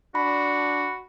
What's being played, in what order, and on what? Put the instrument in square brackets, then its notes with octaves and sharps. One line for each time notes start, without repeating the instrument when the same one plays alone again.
[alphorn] D4 [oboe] F#4 [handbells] B5